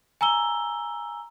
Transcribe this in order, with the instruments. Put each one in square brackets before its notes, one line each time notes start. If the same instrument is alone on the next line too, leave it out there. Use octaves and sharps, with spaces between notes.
[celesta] G#5 A#5 E6 G7